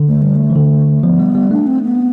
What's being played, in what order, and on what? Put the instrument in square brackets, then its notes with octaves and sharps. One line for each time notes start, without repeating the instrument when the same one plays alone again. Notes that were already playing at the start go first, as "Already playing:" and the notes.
Already playing: [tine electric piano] D3
[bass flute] A3
G3
A3
[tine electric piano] E3
D3
[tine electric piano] F3 [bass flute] B3
[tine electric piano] G3
G3
[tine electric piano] A3 [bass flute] D4
[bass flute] C4
B3